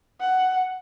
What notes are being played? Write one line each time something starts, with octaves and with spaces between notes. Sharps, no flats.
F#5